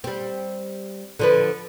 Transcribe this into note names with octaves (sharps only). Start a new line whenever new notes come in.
G3 C4
D3 F3 B4